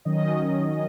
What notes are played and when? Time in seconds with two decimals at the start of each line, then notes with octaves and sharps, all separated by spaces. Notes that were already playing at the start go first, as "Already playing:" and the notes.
0.05 D#3 F#3 C#4 D#5
0.64 D#5